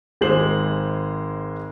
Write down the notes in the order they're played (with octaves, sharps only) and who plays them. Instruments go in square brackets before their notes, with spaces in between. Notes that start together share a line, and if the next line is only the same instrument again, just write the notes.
[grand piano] G#1 G#3 C5 F#7